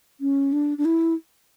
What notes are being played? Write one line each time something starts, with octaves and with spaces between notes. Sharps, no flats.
C#4
D4
D4
E4